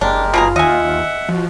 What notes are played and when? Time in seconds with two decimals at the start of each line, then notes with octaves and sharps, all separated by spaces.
0.01 F#1 G#3 D4 G4 A#4
0.34 B2 F4 G#4 A#5
0.56 D#2 D#5 E5 F#5 G#5
1.29 F3 F#4